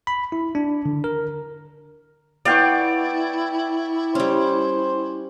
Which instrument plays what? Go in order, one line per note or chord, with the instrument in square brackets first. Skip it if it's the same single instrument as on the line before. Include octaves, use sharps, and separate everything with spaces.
[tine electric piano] B5
E4
D4
D3
A#4
[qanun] B3 F5 [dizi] E4 [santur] D5 G5 C#6
[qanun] G3 C#4 [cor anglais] C5